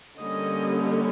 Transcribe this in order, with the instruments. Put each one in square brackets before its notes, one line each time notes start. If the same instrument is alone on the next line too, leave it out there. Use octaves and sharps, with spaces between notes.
[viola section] D3 G3 A#3 C#4 D#5